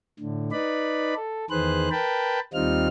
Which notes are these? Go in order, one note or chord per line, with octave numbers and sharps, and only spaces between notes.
A2 D3
D#4 B4 D5 B5
A4
E2 D#3 G#4 B4 C5 F#6
A#4 B4 G5 A5 B5
D#2 G3 C4 D#4 F4 F6